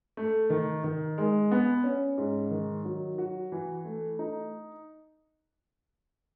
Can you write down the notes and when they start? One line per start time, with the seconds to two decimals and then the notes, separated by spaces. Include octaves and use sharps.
0.17 A3
0.50 D#3
0.84 D#3
1.18 G#3
1.51 B3
1.84 C#4
2.18 G#2
2.51 D#3
2.85 F#3
3.18 F#4
3.52 E3
3.85 A3
4.19 D#4